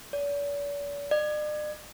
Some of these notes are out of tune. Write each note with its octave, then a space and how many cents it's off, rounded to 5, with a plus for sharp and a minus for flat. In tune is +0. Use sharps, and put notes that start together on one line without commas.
D5 -45
D5 +45